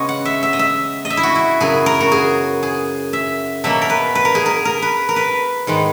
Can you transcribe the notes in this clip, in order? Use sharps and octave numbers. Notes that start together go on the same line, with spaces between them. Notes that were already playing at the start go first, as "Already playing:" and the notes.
Already playing: C#3 G#3 B3 C#5 D#5
F#5
E5
E5
D#5
E5
D#5
E5
E4
F#4
E4
F#2 C#3 F#3 B3 G#4
A#4
F#4
G#4
G#4
E5
B2 F#3 A#3 E5
A#4
B4
B4
A#4
G#4
A#4
A#4
B4
A#4
B4
G#2 D#3 G#3 B3